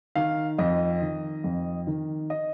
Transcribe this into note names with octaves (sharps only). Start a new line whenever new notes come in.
D#3 F5
F2 D#5
D#3
F2
D#3
D#5